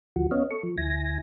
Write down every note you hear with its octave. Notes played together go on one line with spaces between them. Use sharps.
D2 F3 F#4
B3 C#4 C#5 D#5 F5
A4 C#6
F3
D2 E4 G#5 A#6